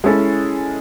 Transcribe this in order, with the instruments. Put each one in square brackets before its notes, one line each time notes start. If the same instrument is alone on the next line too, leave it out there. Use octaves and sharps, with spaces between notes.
[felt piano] G#3 C#4 E4 A4